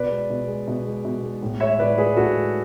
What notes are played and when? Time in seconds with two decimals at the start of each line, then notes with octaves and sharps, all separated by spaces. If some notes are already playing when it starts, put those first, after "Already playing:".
Already playing: B2 B4 D5
0.10 G#3
0.30 B2
0.47 G#3
0.67 B2
0.86 G#3
1.05 B2
1.23 G#3
1.42 A2
1.60 G#3 C#5 E5
1.79 A2 B4 D5
1.98 G#3 G#4 B4
2.16 A2 F#4 A4
2.36 G#3